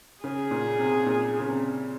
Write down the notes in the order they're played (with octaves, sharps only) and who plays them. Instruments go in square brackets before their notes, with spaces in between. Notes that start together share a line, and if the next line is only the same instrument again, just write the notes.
[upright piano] C#3 [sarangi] G#4
[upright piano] A#2
C3
A#2
C#3
C3